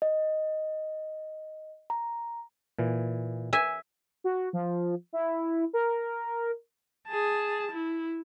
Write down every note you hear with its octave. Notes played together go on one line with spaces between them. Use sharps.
D#5
A#5
A#2 E3
E5 G#5
F#4
F3
E4
A#4
G#4 A5
E4